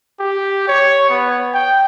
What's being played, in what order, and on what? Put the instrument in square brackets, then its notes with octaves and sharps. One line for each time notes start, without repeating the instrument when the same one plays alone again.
[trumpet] G4
C#5
B3
G5